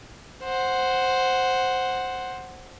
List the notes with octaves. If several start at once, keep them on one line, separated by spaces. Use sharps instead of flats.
C5 F#5